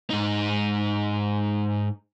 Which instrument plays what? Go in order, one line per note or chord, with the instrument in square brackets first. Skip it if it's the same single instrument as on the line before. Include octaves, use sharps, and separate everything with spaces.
[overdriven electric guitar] G#2 D#4